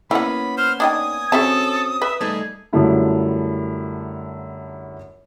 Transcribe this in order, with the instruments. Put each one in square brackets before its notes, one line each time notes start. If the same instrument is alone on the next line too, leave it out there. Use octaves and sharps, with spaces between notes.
[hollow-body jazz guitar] A#3 B3 C#4 [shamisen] E4 F#5 [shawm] B5
[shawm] C5 [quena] F6
[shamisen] D4 D#4 G5 [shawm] G#5 [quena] D#6
[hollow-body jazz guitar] C4 C#4 F#4 [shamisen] G#4 E5 A5 [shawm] A4
[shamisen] B4 [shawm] E5
[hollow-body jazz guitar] G3 A3 D#4 [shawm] G#4
[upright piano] F#2 D3 G3 A3 E4 F4